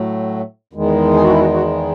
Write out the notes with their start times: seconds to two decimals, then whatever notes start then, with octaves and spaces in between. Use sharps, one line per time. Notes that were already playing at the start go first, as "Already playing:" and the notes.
Already playing: A2 F#3 A3
0.73 E2 D#3 G#3
1.14 G#4
1.22 F#4
1.31 E4
1.40 F#4
1.53 F#4